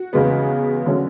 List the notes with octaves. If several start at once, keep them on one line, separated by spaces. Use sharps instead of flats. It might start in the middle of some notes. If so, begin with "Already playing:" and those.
Already playing: F#4
E2 C#3 G#3 B3
D3 F#3 A3 C#4